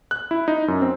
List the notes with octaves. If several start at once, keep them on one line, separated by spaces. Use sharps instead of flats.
F#6
E4
D#4
F#2
C4